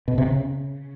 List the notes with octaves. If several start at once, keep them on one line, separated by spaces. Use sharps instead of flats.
B2
C3
C#3